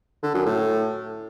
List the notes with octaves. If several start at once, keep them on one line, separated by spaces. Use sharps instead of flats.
D3
F#2
A2